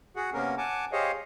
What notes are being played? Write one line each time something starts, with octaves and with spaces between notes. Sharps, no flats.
F#4 G#4 F#5
C3 A#3 B3 C#4 A#4
F#5 G#5 A5 D6
G4 G#4 C5 C#5 D#5 F5